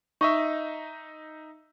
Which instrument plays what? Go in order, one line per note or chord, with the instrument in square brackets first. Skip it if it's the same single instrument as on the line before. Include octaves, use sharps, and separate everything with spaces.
[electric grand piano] D#4 D#5 E5 [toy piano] C#6